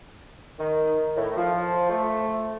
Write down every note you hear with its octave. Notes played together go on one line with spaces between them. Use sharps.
D#3
A2
F3
A3